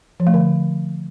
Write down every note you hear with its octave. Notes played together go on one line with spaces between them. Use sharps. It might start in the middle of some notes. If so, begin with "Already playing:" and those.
F3
A3
D3